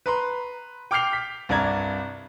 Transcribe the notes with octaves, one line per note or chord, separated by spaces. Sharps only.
B4 A#5 C6
G5 D6 F6 G6 C7 F7
B6
C2 G2 D5 A#5 G#6